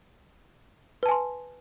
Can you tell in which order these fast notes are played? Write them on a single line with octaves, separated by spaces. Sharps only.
B4 A5 G#5 C6